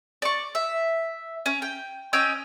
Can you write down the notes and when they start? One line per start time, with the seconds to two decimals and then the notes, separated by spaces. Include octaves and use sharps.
0.22 D5 C#6
0.55 E5
1.46 C#4
1.62 G5
2.13 C#4 D#5 G5 E6